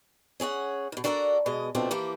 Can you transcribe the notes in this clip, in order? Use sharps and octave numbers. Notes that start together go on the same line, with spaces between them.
C#4 G#4 C#5 F#5
B2 D#3
D4 F#4 A4 A#4 C5 D5
B2 G#3 D#5
D2 B2 F3 A3 C4 D4
E3 F3 A#3 G4